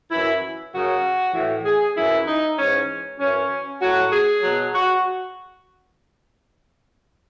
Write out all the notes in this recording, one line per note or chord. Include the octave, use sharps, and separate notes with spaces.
F#2 E3 E4
F#2 C#3 F#3 F#4
A2 E3
G#4
F#2 E3 E4
D#4
G#2 E3 C#4
F#2 E3 C#4
A2 F#3 F#4
G#4
B2 F#3
F#4